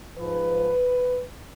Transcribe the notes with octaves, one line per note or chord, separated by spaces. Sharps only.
G#2 F3 B4